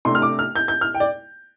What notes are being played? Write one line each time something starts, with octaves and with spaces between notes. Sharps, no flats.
C3 A3 D4 C6
F6
D6
F6
G6
G6
F6
G5
D5